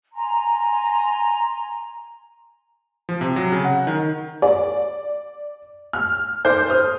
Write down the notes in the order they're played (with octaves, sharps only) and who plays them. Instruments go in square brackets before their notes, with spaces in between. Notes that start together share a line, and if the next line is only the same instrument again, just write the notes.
[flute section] G#5 A#5 C6
[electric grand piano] F3
C3
F#3
C#3
F#5
D#3
[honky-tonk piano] D5
F6
[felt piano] A4 C5 D6 [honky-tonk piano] G6
[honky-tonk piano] C5 [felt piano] D#6 F6